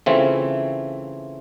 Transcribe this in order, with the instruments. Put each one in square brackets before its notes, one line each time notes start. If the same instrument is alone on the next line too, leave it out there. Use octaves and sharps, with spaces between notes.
[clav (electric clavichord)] C#3 E3 A3 C4 F4